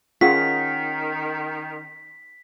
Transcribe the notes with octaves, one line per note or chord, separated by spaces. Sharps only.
D#3 C#4 F4 G#4 F#5 B6